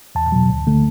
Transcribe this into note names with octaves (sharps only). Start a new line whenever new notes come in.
E2 A5
B2 F#3
D2
D3 A3